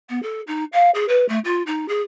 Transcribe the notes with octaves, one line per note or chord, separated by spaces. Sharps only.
B3
A4
D#4
F5
G#4
B4
A3
F4
D#4
G#4